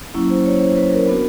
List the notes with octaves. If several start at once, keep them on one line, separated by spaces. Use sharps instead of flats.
F#3 A#3 C#4 E4
C5
C#5
C5
B4
A#4
B3 D4 F#4